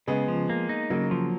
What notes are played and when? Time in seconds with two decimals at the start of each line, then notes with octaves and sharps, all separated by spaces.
0.07 C#3 G#3 B3
0.28 F3
0.50 A#3
0.69 D#4
0.90 C#3 F#3 A#3
1.11 F3